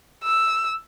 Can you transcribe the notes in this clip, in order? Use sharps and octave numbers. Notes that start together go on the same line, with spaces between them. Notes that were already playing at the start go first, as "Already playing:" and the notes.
E6